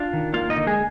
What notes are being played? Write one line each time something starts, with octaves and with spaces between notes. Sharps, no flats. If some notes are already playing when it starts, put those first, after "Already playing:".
Already playing: D4 F4 F5
D#3
A#3 F4 F5
D#4 D#5
D3
G#3 G#4